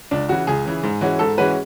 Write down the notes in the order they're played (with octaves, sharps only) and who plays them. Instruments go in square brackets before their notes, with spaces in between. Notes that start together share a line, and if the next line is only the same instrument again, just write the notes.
[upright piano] C#2 [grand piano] D4
[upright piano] C#3 E3 [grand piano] F#4
[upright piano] C#2 [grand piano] G#4
[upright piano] C#3 E3
G#2
E3 G#3 C#4 F#4
[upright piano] G#2 [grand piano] A4
[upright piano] E3 G#3 C#4 F#4 [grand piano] B4